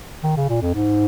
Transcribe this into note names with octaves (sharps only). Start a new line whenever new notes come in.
D#3
C#3
A#2
F2
G#2